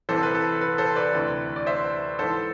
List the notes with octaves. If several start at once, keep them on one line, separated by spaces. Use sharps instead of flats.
C2 C3 E3 A4 C5
B4
A4
B4
A4 C5
B4 D5
D2 C3 E3
D5
C5 E5
G#2 E3 A4 C5